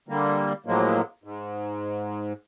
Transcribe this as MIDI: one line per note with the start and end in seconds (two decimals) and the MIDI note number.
0.09 0.53 50
0.09 0.53 55
0.09 0.53 58
0.66 1.01 45
0.66 1.01 53
0.66 1.01 54
0.66 1.01 56
0.66 1.01 58
1.24 2.33 44